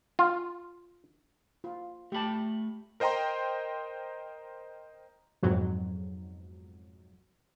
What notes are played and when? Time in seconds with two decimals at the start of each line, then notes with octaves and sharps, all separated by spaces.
0.19 F4
1.64 F4
2.12 A3 G4 A5 B5
3.00 A#4 C5 D#5 G5 A#5 C6
5.43 F2 G#2 B2 F#3